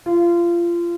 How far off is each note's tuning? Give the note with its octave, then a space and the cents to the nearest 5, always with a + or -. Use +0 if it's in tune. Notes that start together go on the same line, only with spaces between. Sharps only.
F4 -25